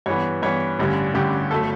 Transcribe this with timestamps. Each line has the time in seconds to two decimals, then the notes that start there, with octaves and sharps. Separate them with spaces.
0.06 G2 E3 B3 C#5
0.42 G2 E3 B3 C#5
0.79 A1 G2 D3 G3 C#4
1.14 A1 G2 D3 G3 C#4 G4
1.50 G1 F#3 A3 A4